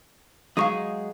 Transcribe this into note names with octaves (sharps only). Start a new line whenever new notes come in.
F#3 G#3 D#4 F5 C#6 D#6